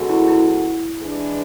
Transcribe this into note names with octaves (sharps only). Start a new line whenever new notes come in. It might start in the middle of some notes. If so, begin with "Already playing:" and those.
Already playing: C#3 G#3 B3 F#4 A4
E4
E4
E3 G#3 D4 G#4 B4